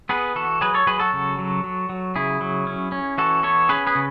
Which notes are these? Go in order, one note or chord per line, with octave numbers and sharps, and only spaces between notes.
B3 G#4 B4
E3 F#4 A4
F#3 G#4 B4
A4 C#5
F#3 G#4 B4
F#4 A4
C#3
F#3
F#3
F#3
C#3 E4 G#4
F#3
C#4
C#4
E3 F#4 A4
B3 A4 C#5
C#4 G#4 B4
G#4 B4
C#3